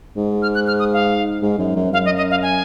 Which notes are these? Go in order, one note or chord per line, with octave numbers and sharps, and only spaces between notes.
G#2
F6
F#6
F6
D#6
F5
G#2
F#2
F#2
F#2 F5
D#5
D#5
F5
G#5